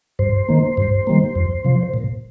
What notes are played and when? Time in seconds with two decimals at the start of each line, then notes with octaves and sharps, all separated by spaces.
0.19 G2 C5
0.48 D#3 A#3
0.77 G2
1.07 D#3 G3 A#3
1.35 F2
1.64 C3 F3
1.94 A#2